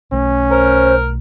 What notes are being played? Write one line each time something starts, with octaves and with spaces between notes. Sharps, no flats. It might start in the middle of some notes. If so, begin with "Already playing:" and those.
B1 A3 C#4
A#4 C5